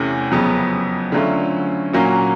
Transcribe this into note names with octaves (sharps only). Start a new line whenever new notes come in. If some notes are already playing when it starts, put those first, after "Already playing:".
Already playing: E2 C3 E3 A3 C#4
F2 C#3 F#3 B3
D3 F#3 A3 C#4 F4
A#2 F#3 A#3 C#4 F#4